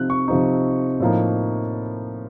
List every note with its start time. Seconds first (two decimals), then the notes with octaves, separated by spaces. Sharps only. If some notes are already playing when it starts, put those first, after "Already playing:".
Already playing: C3 F3 C4 D#4 F#6
0.10 C#6
0.28 C3 F3 C4 D#4
1.00 A2 F3 A#3 D#4